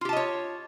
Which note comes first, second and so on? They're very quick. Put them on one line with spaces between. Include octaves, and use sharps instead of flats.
F4 G4 A5 D#5 C#5